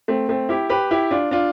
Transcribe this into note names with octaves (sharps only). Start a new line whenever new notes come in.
A3 C4
A3 C4
E4 G4
G4 B4
E4 G4
D4 F4
D4 F4